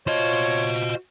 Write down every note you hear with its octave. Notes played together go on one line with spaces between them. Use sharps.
F4 F#4 C5 C#5 D#5